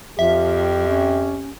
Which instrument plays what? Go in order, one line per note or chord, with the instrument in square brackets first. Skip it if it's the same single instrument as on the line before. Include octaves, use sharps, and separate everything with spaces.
[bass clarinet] F2 [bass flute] F3 [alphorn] G4 [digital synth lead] E5
[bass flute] C#4